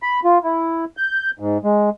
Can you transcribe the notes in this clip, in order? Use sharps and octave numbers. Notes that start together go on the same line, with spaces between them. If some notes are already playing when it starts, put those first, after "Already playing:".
B5
F4
E4
G6
G#2
G#3